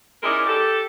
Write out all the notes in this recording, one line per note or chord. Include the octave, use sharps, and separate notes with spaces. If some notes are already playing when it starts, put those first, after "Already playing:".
G#3 C#4 D#4 E4 A#4 D5
G4 A4